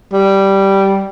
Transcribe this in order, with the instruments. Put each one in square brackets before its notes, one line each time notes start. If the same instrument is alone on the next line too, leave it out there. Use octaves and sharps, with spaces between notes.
[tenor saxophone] G3